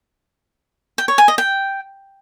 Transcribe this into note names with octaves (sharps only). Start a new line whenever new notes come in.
G5
C#5
G#5
D#5
G5